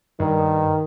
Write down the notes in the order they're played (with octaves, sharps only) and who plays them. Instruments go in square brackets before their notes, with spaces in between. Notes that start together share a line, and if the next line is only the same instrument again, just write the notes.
[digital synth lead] G2 [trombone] D#3